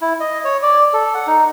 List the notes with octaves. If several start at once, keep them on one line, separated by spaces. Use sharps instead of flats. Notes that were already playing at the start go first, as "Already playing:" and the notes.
E4
D#5
C#5
D5
A4
F#5
D#4